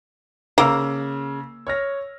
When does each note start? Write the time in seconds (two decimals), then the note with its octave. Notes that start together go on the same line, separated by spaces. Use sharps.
0.58 C#3 A#3 E6
1.67 C#5 F6 A#6